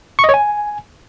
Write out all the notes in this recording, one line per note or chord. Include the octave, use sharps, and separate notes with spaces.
C#6
D#5
C#5
G#5